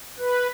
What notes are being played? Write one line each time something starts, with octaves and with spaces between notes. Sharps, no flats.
B4